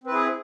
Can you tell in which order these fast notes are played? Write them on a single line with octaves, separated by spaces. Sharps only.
C4 B4 E4 G#4